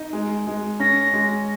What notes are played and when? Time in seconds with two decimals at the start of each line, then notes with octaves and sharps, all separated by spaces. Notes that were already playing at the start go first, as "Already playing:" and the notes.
Already playing: D#4
0.13 G#3
0.47 G#3
0.80 C#4 A#6
1.14 G#3